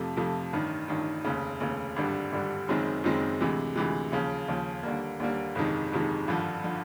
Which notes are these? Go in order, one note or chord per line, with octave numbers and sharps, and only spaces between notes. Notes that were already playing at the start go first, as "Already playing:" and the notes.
Already playing: F2 C3 F3 A3
F2 C3 F3 A3
A1 G2 D#3
A1 G2 D#3
F1 D#2 C#3
F1 D#2 C#3
G#1 G2 D3 G3
G#1 G2 D3 G3
F#1 F#2 D#3 G#3 C4
F#1 F#2 D#3 G#3 C4
D2 C3 E3 G#3
D2 C3 E3 G#3
D#2 C#3 F3
D#2 C#3 F3
D#2 D3 G3 A#3
D#2 D3 G3 A#3
G1 F2 C3 D#3 G#3
G1 F2 C3 D#3 G#3
G#1 G2 D3 F3
D3 F3